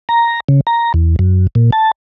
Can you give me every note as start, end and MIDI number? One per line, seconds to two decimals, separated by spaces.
0.09 0.40 82
0.49 0.61 49
0.67 0.92 82
0.94 1.16 40
1.19 1.47 42
1.55 1.70 46
1.72 1.91 81